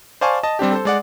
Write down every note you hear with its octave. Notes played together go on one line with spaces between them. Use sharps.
C5 D5 F5 G#5 A5 C#6
D#5 A5
G3 C4 D4 G4
A4 C5
G#3 D5 F#5